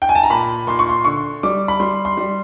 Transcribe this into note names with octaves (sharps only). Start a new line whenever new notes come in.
G5
G#5
A5
A#5
A#2 B5
A#2 C6
C#6
C6
D3 C#6
G3 D6
B5
G3 C6
C6
G3